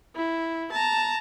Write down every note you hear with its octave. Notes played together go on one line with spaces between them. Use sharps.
E4
A5 A#5